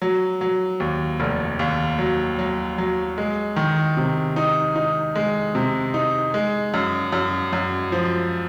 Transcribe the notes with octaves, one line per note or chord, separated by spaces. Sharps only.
F#3
F#3
D#2
F1
D#2
F#3
F#3
F#3
G#3
D#3
C3
D#4
D#4
G#3
C3
D#4
G#3
F#2
F#2
F#2
F3